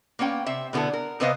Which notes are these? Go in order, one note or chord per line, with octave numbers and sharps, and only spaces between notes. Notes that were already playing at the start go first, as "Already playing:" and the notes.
A#3 B3 C#4 G5
C3 C4 E5
B2 D3 B3 E4 A4
A#4
C3 B3 B4 C5 D#5 F5